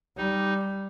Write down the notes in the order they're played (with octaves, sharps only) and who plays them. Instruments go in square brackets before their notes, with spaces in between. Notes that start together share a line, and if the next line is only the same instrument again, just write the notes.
[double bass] G3 [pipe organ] D#4